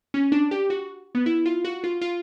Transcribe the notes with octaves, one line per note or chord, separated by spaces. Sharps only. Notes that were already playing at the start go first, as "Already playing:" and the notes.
C#4
D4
G4
F#4
B3
E4
F4
F#4
F4
F4